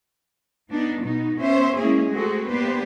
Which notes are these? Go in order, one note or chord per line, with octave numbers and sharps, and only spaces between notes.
B3 D4 D#4
B2 B3 D#4
B3 C#4 C5 E5
G#3 A#3 C#4 E4 G#4
A3 C4 F#4 G#4 A4
A#3 B3 D4 G4 B4 C5